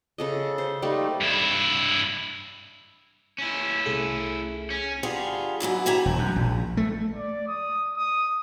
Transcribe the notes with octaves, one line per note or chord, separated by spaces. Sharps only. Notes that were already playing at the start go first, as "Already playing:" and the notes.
C#3 A4 D#5
C5
G3 A3 A#3 D#4
G2 E4
C#4 E4
C2 A3 G#4
C#4
D3 G3 F4 G#4
D2 G#2 F#3 E4
D3 G3 E4 G#5 A#5
E1
F#2
A#1
A3
D5
D#6
D#6